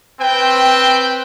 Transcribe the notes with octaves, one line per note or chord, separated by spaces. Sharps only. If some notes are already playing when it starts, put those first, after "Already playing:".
C4 B4 G5